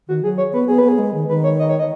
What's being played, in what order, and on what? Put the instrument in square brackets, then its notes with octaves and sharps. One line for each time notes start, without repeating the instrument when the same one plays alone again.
[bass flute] D#3 [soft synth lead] F#4
[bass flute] F#3 [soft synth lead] G#4
[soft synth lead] C#5
[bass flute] B3 [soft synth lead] B4
[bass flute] B3 [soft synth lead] G#4
[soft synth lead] B4
[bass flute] B3 [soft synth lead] G#4
[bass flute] G#3
D#3
[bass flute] D#3 [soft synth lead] B4
[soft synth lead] C#5
D#5
C#5
D#5